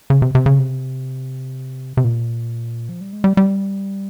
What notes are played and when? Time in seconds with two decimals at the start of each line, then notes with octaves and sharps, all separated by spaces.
0.10 C#3
0.22 C3
0.35 C3
0.46 C#3
0.59 C3
1.97 C3
2.04 A#2
2.89 F3
3.01 G3
3.13 G#3
3.24 G3
3.37 G3